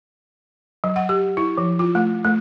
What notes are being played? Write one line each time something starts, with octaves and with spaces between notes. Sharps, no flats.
F#3
F#5
G4
E4
F3
F4
A3
A3